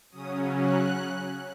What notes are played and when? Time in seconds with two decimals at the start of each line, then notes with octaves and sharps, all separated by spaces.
0.11 C#3 F#3 C#4 D#6
0.57 F#6